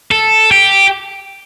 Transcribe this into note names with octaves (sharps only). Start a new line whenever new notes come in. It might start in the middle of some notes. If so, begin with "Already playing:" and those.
A4
G4